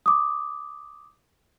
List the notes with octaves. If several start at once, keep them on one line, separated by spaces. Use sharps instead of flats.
D6 D#6